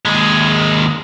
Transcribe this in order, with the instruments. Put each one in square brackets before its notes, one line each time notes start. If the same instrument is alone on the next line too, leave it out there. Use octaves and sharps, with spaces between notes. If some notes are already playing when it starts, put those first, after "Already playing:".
[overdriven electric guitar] D#2 G#3